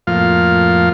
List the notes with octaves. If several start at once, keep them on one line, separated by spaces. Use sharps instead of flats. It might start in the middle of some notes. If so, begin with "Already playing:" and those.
F2 A2 F3 A#3 F4 F5